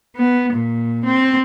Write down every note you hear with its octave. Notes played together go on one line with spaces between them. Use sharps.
B3
A#2
C4